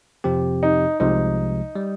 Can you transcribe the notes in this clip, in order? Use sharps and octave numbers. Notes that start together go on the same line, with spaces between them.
F2 C3 F3 C4 G4
D#4
C2 C3 F3 G#3 D#4
G3